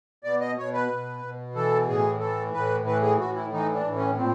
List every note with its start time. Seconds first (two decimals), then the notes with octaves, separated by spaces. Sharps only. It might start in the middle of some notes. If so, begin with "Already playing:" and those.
0.24 B2 D5
0.40 D#5
0.57 B2 C#5
0.73 B4
0.89 B2
1.22 B2
1.55 E3 A4
1.88 A2 G#4
2.20 E3 A4
2.53 A2 B4
2.86 E3 B4
3.02 G#4
3.19 A2 F#4
3.35 E4
3.52 E3 D#4
3.74 D4
3.85 A2
3.96 C#4
4.18 A#2 C4